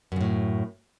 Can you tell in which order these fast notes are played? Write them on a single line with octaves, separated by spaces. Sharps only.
F#2 C#3 A2